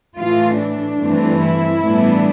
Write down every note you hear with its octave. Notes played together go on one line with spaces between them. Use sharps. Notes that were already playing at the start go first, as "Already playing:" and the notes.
A2 E3 A3 F4
D4
G2 E3 A3 C4
E4
A2 E3 G3 B3 D4